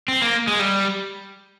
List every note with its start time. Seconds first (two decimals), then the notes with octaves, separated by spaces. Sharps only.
0.08 C4
0.22 A#3
0.48 G#3
0.59 G3